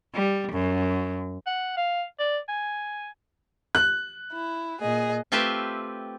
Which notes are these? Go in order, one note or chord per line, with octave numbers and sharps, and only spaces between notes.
G3
F#2
F#5
F5
D5
G#5
F#6
E4
A#2 G#4 D#5
A3 C4 F4 G4 B4 E5